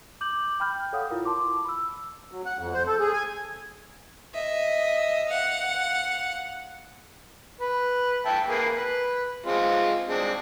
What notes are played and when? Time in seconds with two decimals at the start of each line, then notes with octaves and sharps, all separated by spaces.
0.21 D6 G6 F#7
0.60 G5 B5 F6 G6
0.93 A4 C#5 F5 F#5 D#6
1.11 E4 F4 A#4
1.25 A5 C6 D6
1.65 B5 E6
2.32 F#3
2.46 F#5
2.59 F2
2.73 C5
2.87 A4
3.00 G#4
3.13 G#5
4.34 D#5 E5
5.29 F5 F#5
7.61 B4
8.26 E5 G5 A5
8.48 A#3 G#4 B4
8.75 B4
9.46 G#3 C4 F4
10.09 G#3 C4 D4